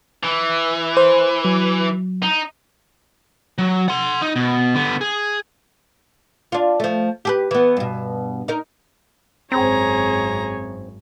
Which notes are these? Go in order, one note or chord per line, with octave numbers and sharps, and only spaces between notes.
E3
C5
F#3
D#4
F#3
F#5 C6
D#4
B2
D3 B3
G#4
D4 F4
F3 A3
G4 G#4 B4
E3 B3
G2 B2
D#4 A#4
G#1 F#2 C4 G#4 C#5 A#5